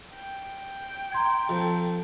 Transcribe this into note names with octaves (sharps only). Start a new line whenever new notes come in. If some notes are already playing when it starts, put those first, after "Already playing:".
G5
A#5 C6 G#6
F2 A4